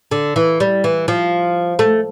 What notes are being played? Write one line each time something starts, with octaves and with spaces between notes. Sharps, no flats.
D3
E3
G3
E3
F3
A3